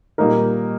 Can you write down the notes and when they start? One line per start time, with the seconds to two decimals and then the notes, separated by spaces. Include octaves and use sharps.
0.18 A#2 G3 A#3 D#4 A#4